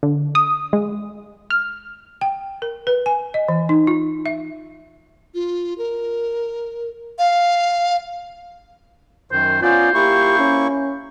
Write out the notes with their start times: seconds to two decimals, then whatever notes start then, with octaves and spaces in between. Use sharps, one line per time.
0.03 D3
0.35 D#6
0.73 G#3
1.50 F6
2.21 G5
2.62 A#4
2.87 B4
3.06 G#5
3.34 D#5
3.48 E3
3.69 D#4
3.87 F4
4.26 E5
5.35 F4
5.78 A#4
7.19 F5
9.32 F#2 D#3 C5
9.62 B3 C#4 F4 C5 D5
9.94 A#3 E4 G4 C#6
10.39 C#4